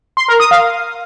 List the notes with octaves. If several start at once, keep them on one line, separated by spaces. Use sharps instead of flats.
C6
A#4
D#6
F5